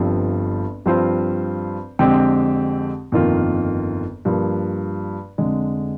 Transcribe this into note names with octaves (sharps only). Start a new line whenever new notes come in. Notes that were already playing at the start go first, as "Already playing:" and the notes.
Already playing: G1 G2 F3 C4
G2 F3 C4 F4 C5
F2 D3 G#3 C4 G4
G1 F2 D#3 A#3 F4
G2 F3 A#3
F1 F2 D3 G#3